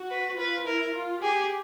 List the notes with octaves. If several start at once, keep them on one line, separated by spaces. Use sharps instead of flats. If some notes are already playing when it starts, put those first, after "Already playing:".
Already playing: F#4
B4
F4 B4
E4 A#4
F4
G4 G#4